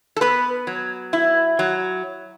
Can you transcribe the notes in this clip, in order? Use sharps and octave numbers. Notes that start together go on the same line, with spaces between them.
A4
B3 B4
F#3
E4
F#3